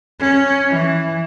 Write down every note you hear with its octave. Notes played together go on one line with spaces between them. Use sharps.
C#4
E3